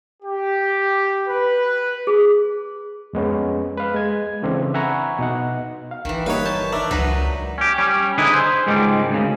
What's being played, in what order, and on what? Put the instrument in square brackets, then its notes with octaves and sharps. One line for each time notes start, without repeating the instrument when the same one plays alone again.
[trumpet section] G4
B4
[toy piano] G#4
[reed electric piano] F2 G#3 B3 C#4
B4 F5
G#3 G#6
C#3 E3 C4 D4 A4
E5 F#5 G#5 A#5 B5 C#6
B2 D#4 F#5
F5
[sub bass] G1 [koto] D#3 E3
[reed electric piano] G3 A#3 D#4 [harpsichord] B4 C#5
[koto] A5 [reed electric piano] G6
[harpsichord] D4 [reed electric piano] A#4 E5
[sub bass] C#2 [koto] F#3 D#4 B4
[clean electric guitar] C#4 G4
G3 C#4
D3 D#4 E4 G#4 B4
C5
C#2 G#2 D#3 G3 G#3
D2 C#3